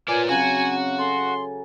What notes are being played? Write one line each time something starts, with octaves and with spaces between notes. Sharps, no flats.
A#3 F4 B4 C#5 D5 G#5
C#3 F#3 C4 F#4 G#5
A4 G#5 C6